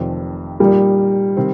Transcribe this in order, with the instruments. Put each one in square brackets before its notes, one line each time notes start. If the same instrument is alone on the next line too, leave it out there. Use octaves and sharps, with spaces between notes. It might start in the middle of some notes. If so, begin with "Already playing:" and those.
Already playing: [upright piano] F1 F2 C3 D#3 C4
[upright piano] A#2 F3 D#4 A#4 [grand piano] G3
[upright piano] C3 D#3 C4